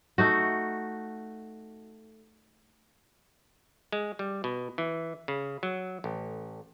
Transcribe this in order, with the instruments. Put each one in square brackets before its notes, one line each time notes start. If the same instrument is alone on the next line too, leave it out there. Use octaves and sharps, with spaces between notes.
[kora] A3 D#4 F#4
[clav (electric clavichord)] G#3
G3
B2
E3
C#3
F#3
A1